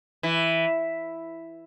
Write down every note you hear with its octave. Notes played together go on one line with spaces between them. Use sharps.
E3